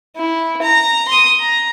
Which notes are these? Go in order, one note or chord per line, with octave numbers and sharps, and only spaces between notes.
E4
A#5
C6 D#6
A#5